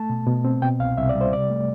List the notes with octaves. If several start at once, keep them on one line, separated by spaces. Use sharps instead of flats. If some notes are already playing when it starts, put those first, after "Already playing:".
Already playing: A3 A5
B2
B2
C4
B2 G5
C2 F5
C2 E5
D5
G3
C5
C3 D5
A3